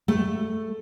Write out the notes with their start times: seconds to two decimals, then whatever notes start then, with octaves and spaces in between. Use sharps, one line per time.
0.08 A3